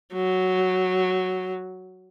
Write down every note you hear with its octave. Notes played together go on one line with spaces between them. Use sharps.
F#3